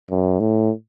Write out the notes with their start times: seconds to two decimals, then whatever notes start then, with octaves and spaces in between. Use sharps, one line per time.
0.10 F#2
0.40 A2